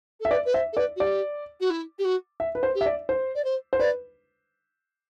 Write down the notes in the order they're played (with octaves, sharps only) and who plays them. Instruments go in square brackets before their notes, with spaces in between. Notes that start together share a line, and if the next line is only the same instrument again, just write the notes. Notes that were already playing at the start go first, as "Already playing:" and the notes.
[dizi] A4 [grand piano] E5
[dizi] B4 [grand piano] D5
[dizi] B4
[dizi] C5 [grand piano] E5
[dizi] A4
[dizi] B4 [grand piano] D5
[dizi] F#4
[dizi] G4 [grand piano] D5
[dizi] F#4
E4
G4
F#4
[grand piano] E5
B4
C5
[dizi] G4
[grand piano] E5
D5
C5
[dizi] D5
C5
[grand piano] C5
[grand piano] B4 [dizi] D5